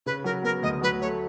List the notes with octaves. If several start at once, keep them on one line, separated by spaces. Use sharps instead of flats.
C#3 B4
F#3 A#4
B3 A#4
D2 D#5
F#3 B4
A3 C#5